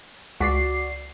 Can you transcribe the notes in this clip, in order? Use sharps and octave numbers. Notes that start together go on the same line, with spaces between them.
C#2 F#4 D5 B6 C7